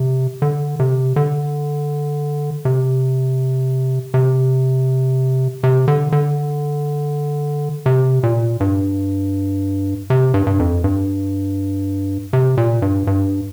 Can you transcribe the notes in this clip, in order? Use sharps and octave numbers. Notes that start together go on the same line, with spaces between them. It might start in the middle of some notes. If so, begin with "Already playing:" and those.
Already playing: C3
D3
C3
D3
C3
C3
C3
D3
D3
C3
A#2
G2
C3
G2
G2
F2
G2
C3
A#2
G2
G2